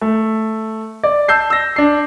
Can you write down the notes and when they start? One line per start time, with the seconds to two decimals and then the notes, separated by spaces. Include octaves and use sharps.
0.01 A3
1.03 D5
1.28 A5 E6 G6 C7
1.50 E6 A#6
1.76 D4 C7